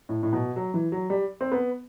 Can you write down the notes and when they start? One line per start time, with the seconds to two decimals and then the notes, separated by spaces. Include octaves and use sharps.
0.09 A2
0.23 A2
0.33 B2
0.56 F#3
0.74 E3
0.92 F#3
1.10 G3
1.41 C4
1.52 B3